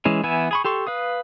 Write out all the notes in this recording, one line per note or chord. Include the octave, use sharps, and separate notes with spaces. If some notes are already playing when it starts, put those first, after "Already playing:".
E3 G#3 C#4
E3 B3 E4 G#5
G#4 B5 C#6
G4 A4 C6 C#6
B4 F5 D#6